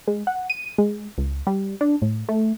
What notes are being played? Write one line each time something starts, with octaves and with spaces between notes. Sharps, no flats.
G#3
F#5
D#7
G#3
C#2
G3
D4
A2
A3